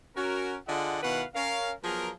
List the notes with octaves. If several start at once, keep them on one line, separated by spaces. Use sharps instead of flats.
C#4 F#4 A#4
D3 F4 G#4 D5 D#5 F#5
B2 D#3 E4 B4 F5 F#5
C#4 A#4 F5
F3 F#3 B3 G#4 A#4